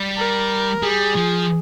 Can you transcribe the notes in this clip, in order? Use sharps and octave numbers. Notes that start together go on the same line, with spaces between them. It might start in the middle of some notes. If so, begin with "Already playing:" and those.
Already playing: G3
A#4
G3 G#4
F3